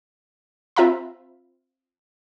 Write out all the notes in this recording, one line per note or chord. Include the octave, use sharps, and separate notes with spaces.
C4 F4 E5 F5 A#5 B5